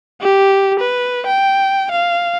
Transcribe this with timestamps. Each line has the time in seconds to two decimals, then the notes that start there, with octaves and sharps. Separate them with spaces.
0.21 G4
0.80 B4
1.27 G5
1.92 F5